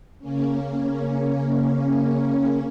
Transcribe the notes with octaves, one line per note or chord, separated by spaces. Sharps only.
C#3 A#3 C#4